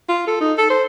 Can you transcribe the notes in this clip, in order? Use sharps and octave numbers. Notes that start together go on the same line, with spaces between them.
F4
A4
D#4
A4
C5